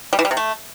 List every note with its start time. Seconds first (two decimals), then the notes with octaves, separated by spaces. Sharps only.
0.13 G3
0.19 E3
0.25 G3
0.31 C3
0.37 A3